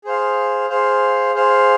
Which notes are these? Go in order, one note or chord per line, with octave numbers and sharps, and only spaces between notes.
G#4 C5 F5
G#4 C5 F5
G#4 C5 F5